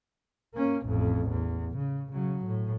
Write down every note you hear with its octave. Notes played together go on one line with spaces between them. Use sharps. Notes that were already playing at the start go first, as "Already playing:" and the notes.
A#3 C#4
A1 F2
E2
C#3
C#3 F#3
A2